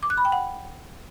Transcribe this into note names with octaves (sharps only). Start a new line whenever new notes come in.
D6
F#6
B5
G5
F#5